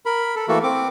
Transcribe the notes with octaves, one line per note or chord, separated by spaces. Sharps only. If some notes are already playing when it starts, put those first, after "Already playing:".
A#4 B5
A4
E3 A3 A#3 F#4 A4
C4 D6